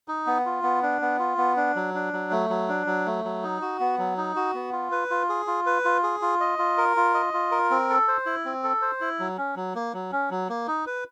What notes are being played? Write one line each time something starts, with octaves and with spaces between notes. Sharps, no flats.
D#4
B3
F4
B3
D4
B3
F4
B3
D4
F#3
D4
F#3
A3
F#3
D4
F#3
A3
F#3
D#4
F#4
B3
F#3
D#4
F#4
B3
F4
B4
F4
G#4
F4
B4
F4
G#4
F4
D#5
F4
A#4
F4
D#5
F4
A#4
C4
A4
C5
E4
C4
A4
C5
E4
F#3
C#4
F#3
A#3
F#3
C#4
F#3
A#3
D#4
B4